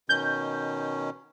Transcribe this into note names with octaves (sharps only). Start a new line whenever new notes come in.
B2 D#3 C#4 G6